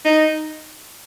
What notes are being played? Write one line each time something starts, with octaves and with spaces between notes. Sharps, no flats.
D#4